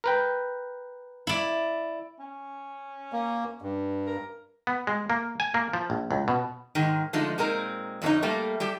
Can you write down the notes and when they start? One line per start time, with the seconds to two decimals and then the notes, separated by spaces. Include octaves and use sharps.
0.04 A#4 B4 G5
1.27 E4 D5
2.19 C#4
3.13 A#3
3.62 G2
4.06 A#4
4.67 B3
4.87 G#3
5.10 A#3
5.40 G#5
5.54 A#3
5.73 F3
5.90 A#1
6.11 C#2
6.28 B2
6.75 G#2 D#3 G#3
7.13 D3 F3 G#3 A3 D#4
7.38 A#2 G#3 C4 D#4 A#4
8.02 F2 D3 F#3 A3 C#4 D#4
8.22 G3 A3 A#3
8.60 G3 G4 A4